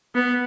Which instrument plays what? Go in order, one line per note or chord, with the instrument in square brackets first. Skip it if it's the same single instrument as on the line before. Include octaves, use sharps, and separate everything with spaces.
[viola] B3